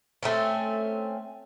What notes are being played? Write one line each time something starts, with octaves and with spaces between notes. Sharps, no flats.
A3 C4 C#4